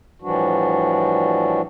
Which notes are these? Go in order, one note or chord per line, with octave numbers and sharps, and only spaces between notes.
A2 E3 F3 G3 D4 F#4